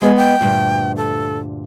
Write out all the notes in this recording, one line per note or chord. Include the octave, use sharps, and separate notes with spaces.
G#3 B3 G#4 D#5
G5
D2 G2 A#2
A4